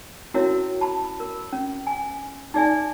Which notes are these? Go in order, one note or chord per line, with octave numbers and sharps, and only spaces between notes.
C#4 E4 F#4 A#4 C#5 E5
A5 B5
A#4
C#4
G#5
D#4 G#4 D5 E5 G#5